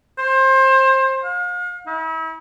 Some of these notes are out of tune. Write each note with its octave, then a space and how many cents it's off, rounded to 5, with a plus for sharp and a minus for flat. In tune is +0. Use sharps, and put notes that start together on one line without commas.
C5 +25
F5 +40
E4 -40